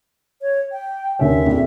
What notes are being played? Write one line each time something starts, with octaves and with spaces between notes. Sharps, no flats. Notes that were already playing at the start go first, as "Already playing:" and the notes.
C#5
G5
D#2 D3 C#4 E5
A#1 F2